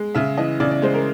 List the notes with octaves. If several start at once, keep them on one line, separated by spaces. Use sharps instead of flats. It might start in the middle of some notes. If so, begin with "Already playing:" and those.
Already playing: G#3
C#3 E5
E3 D#5
C#3 D5
D5
G#3 C5
A#4